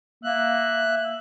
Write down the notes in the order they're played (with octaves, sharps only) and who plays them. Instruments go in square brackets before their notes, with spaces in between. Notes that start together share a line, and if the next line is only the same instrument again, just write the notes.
[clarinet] A#3 [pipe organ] E5 F#6